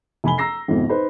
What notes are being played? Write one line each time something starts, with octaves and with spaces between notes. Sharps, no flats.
F1 G#5 B5 G7
A#5 E6 A#6 C7
G#1 F2 B2
D#4 B4 C5 B5